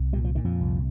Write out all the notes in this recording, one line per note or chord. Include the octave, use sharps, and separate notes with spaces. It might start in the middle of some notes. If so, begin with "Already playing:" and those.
Already playing: C2
A#2 G3
F3
A#2 D#3
F2 F3
C2